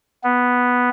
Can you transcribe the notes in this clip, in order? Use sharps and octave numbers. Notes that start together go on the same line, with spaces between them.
B3